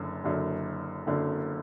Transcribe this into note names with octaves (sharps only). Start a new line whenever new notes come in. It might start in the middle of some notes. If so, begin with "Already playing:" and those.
Already playing: F#1 F#2 D3
F#1 F#2 D3
F#1 F#2 D3